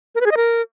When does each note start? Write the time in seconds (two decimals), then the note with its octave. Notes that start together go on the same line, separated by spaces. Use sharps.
0.15 A#4
0.21 B4
0.26 G#4
0.31 D#5
0.37 A#4